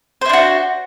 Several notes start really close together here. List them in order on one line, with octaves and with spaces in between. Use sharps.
C5 E4 D4 F#4